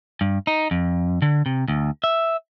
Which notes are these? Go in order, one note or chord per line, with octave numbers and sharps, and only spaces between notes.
G2
D#4
F2
D3
C3
D2
E5